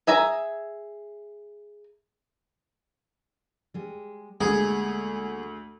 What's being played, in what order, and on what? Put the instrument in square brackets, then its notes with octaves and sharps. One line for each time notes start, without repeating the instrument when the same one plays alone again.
[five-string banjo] G#4 E5 G#5 A#5
[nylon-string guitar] G3 G#3
[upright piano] D2 [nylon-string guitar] G3 A#3 G#5 [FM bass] G#3 [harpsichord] G#4